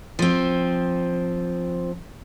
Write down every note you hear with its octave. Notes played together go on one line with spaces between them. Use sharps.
F3 C4